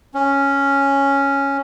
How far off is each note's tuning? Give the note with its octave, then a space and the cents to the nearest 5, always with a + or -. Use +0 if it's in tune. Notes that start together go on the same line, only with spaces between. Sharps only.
C#4 +0